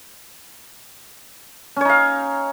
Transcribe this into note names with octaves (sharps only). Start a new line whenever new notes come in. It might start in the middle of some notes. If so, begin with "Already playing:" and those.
C#4 D#4 C#5 F5